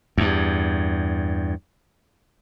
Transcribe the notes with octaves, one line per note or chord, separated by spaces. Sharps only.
E2 G2